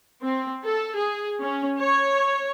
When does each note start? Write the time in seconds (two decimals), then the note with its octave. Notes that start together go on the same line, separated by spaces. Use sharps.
0.22 C4
0.63 A4
0.96 G#4
1.40 C#4
1.80 C#5